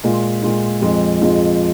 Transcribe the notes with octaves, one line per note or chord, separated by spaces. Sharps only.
A#2 G#3 F4
A#2 G#3 F4
F2 F3 G#3
F2 F3 G#3